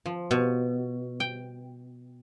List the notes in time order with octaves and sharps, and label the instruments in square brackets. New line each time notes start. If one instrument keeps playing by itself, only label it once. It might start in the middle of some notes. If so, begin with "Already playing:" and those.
[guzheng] F3
B2
G5